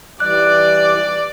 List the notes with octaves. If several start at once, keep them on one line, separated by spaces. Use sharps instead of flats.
E3 G3 D5 D6 F#6